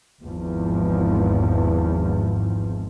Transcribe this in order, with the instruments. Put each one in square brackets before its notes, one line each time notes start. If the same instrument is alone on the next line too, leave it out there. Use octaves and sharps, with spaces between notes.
[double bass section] G#1 E2 G#2 F3